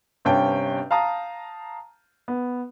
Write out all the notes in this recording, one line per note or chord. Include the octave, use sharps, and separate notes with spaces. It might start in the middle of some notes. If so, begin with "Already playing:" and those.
G1 G2 C3 C#4 G5 A5
F5 A5 A#5 D#6
B3